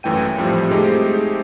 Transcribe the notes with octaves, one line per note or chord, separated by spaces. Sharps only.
G#1 F#2 E3 A3 G5 D#7
F2 A2 F3 G3 C4
G#3 A3 C4 D#4 G4 G#4